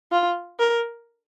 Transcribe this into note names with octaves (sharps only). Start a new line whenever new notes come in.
F4
A#4